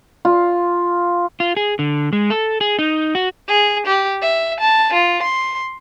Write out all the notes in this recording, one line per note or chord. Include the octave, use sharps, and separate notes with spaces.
F4
F4
G#4
D3
G#3
A4
G#4
D#4
F#4
G#4
G4
E5
A5
F4
C6